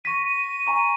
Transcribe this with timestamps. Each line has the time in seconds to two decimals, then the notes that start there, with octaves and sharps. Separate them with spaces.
0.05 C#6 A#6 B6 D#7
0.26 D#7
0.67 G#5 A#5 C#6